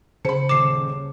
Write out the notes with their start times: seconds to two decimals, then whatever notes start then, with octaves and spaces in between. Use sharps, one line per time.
0.25 C#3 C5 A5 B5 C#7
0.49 D#1 D6 C7 E7